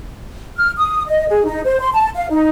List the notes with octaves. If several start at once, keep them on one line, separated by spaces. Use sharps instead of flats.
F6
D#6
D#5
G#4
D#4
C5
C6
A5
F5
D#4